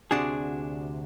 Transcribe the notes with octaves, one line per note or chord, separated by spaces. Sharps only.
D2 C3 D4 F#4 G#4